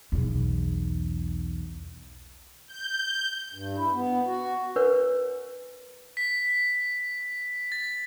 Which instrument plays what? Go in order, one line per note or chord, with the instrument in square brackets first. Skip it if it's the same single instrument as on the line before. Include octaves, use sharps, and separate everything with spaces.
[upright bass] B1 E2
[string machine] G6
[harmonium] G2
E4
B3
F#4
[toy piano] D4 A#4 B4 C#5
[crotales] B6
A6